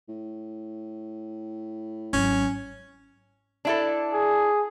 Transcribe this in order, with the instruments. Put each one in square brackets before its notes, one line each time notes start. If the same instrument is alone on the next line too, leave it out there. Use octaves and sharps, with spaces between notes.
[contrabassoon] A2
[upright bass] G#1 F#3 [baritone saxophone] C#4
[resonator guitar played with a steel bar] D4 E4 A4
[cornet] G#4